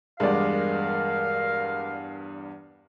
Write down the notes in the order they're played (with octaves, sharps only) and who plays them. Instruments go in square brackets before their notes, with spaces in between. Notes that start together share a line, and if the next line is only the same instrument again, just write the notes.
[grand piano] E2 G2 [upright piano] G#3 D5 [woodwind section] A#4 F5